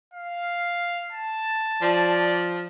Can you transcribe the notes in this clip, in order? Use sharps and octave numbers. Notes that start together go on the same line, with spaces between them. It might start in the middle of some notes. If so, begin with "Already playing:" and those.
F5
A5
F3 D5